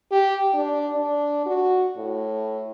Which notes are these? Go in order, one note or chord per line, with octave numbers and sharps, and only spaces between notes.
G4
D4
D4
F#4
A2